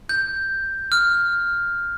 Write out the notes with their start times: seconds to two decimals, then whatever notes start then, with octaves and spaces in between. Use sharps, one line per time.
0.09 G6
0.92 F6